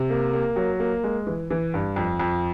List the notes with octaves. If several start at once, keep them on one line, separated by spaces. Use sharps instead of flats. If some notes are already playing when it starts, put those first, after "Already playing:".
Already playing: C3
A#3
A#3
F#3
A#3
G#3
E3
E3
G2
F2
F2